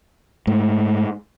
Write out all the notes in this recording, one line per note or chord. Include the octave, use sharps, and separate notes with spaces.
G#2 A3